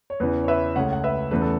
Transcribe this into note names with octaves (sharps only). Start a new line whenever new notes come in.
C#5
E2 C#3 E3 B4
C#5
B4 E5
C#2 C#3 A3 C#5 F#5
F#5
B4 E5
E2 C#3 E3 A3 B4
A4